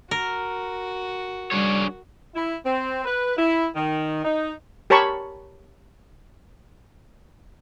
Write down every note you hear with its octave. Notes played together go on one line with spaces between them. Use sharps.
F#4 A#4
G3 D4 G#4 C#5
E4
C4
B4
E4
D#3
D#4
G4 A#4 C#5 A5 B5 C#6